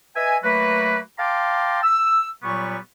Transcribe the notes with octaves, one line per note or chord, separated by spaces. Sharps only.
B4 D#5 E5 G#5
F#3 A3 A#3 F#4 B4
F5 G5 A5 A#5 C6 D6
E6
A#2 F#3 G3 B3 C#6